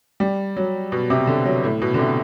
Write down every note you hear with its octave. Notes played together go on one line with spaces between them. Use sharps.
G3
F#3
B2
C3
D3
F#3
A2
B2
D3
C3